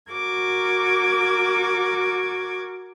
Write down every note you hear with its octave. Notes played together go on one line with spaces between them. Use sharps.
F#4 A#4 D6 G#6